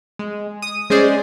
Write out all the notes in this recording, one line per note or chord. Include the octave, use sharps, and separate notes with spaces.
G#3
D#6
G#3 C#4 G#4 C5 D5